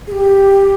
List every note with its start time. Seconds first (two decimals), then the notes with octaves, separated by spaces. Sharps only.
0.07 G#4
0.12 G4